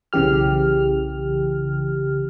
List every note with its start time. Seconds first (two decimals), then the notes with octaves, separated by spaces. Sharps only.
0.13 B1 C#3 E3 G4 F6